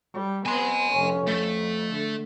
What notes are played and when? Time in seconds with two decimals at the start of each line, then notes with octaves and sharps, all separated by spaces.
0.13 G3
0.46 B3 C4 G#5 C6
0.92 F1 C#4
1.27 F2 A3
1.91 D3